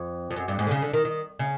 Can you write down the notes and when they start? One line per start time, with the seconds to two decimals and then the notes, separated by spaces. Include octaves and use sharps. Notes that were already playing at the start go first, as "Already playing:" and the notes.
Already playing: F2
0.31 F2
0.36 F#2
0.48 G2
0.59 G#2
0.67 D3
0.71 C#3
0.82 D3
0.94 D#3
1.05 D#3
1.39 C#3